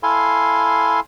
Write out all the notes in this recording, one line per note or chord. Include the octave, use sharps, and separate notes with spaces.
E4 A4 F5 G#5 C6